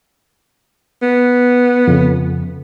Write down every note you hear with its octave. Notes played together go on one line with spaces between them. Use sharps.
B3
F2 C#3